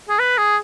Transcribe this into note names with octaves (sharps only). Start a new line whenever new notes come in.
G#4
B4
G#4